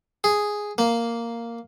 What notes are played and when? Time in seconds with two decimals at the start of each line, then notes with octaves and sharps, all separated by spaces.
0.24 G#4
0.78 A#3